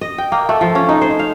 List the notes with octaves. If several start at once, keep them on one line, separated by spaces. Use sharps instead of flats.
D#5
G5
A#3
A3
F3
C#4
D#4
C5
F5